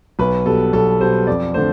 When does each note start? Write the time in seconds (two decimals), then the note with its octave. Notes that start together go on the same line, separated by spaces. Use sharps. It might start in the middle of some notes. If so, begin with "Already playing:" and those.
0.19 B1 B4
0.46 B2 G3 A4
0.73 B1 A4
1.01 B2 G3 C5
1.27 F2 D5
1.54 D3 A3 C5